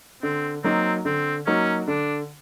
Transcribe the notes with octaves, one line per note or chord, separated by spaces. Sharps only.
D3 C4
F#3 A#3 C4 D#4 F#4
D3 C4
F#3 A#3 C#4 D#4 F#4
D3 D4